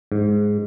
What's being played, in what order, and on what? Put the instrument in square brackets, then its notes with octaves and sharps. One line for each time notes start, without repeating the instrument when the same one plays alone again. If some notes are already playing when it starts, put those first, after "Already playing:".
[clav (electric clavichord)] G#2